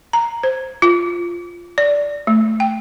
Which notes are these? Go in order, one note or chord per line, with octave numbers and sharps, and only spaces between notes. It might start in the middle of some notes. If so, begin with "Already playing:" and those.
A#5
C5
F4
D5
A3
G5